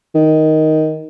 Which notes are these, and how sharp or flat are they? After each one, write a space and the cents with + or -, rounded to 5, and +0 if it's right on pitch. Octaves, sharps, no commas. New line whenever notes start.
D#3 +5